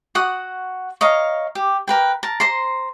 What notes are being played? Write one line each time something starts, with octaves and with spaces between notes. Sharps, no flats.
F#4 F#5 D#6
C#5 D#5 F5 A#5
G4
A#4 B4 G5
A#4 A5
C5 A#5 C6